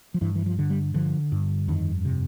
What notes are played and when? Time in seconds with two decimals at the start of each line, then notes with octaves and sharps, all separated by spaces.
0.14 F3
0.21 G2 E3
0.35 E3
0.46 F3
0.59 D3
0.70 G3
0.94 D3 F3
1.32 G2
1.68 F2 D#3
2.05 C3